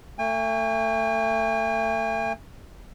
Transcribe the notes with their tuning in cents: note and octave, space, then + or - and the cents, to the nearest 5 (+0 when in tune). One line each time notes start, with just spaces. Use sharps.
A3 +30 G#5 -45